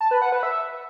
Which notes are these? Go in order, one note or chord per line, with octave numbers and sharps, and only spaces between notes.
A5
B4
F#5
B4
E5